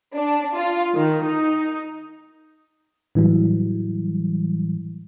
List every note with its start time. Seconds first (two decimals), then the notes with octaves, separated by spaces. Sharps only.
0.16 D4
0.55 F4
0.95 D#3
1.27 D#4
3.15 A2 E3 F#3 G3